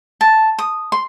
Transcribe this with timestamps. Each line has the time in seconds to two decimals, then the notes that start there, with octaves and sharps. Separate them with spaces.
0.21 A5
0.59 D#6
0.92 C6